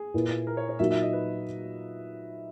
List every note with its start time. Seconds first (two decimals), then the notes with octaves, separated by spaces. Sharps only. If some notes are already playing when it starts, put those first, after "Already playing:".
Already playing: G#4
0.14 A#2 A#3 E4 B4
0.47 A#4
0.57 C#5
0.69 C#5
0.79 A#2 F#3 A#3 D#4 F#4 E5
0.90 E5
1.02 D#5
1.13 B4